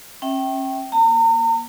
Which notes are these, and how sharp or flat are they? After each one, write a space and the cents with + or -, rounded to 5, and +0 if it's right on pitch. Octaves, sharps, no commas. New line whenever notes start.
C#4 -35 E5 -5 G5 -20
A#3 +30 A#5 -40